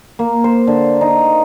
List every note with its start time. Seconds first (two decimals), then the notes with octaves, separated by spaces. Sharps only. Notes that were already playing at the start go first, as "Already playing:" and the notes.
0.19 A#3
0.44 C5
0.67 D3
1.01 D#4